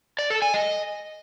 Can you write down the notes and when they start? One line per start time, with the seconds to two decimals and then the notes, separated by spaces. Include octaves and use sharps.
0.19 D5
0.30 A4
0.42 G#5
0.54 D#5